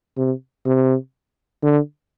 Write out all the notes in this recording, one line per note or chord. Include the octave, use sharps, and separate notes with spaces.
C3
C3
D3